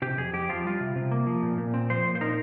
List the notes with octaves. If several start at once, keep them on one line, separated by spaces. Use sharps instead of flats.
C3 G4
F2 G#4
F2 G4
F3 F4
G3 F4
C3
C3
A#3
F3
A#2
A#2
C4
F3 C5
A#2
C5
D#4 A#4